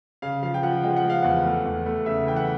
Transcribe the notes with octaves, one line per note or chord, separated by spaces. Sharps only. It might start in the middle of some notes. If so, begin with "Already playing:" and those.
C#3 F5
F3 F5
G5
F3 F#5
G#3 G5
F#5
G#3
F5
E2 F#5
A3
E2
A3
C#3 E5
E3 G5
F#5